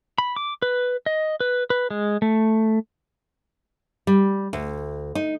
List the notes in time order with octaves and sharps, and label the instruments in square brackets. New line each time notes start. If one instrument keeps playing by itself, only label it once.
[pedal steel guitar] B5
D6
B4
D#5
B4
B4
G#3
A3
[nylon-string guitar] G3
D2
D#4